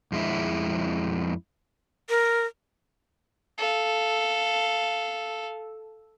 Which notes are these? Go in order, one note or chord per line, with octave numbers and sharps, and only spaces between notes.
F2 G#3 E4
A#4
A4 F5